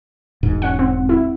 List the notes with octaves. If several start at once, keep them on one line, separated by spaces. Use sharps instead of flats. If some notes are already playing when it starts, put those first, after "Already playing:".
E1 G#2
C#4 F#5
C4
E4